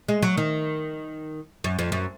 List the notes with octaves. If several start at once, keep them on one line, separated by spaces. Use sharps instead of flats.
G#3
F#3
D#3
F#2
F2
F#2